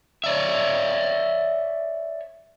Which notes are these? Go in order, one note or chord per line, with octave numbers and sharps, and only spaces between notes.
C#5 D5 E5